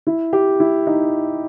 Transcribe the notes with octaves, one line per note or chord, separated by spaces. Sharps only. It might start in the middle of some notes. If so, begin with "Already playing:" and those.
E4
G4
E4
D#4